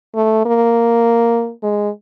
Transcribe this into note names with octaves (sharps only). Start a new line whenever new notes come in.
A3
A#3
G#3